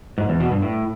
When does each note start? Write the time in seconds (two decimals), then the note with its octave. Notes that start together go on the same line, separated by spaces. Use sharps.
0.18 G#2
0.29 E2
0.40 B2
0.51 G2
0.62 A2